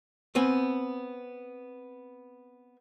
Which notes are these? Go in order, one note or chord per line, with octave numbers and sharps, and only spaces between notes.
B3 C4 G#5